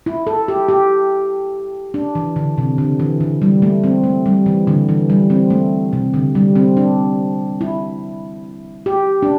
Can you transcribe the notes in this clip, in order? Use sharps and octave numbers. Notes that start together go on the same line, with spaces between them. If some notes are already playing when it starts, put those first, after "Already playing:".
E4
A4
G4
G4
D4
E3
D3
C3
D3
E3
D3
G3
A3
C4
A3
G3
E3
D3
E3
G3
C4
A3
C3
D3
G3
C4
D4
E4
G4
D4